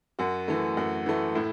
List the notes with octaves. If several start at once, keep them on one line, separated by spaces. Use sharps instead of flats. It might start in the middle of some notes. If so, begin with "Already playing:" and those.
F#2 F#4
E3 A3
F#2 F#4
E3 A3
A2 E4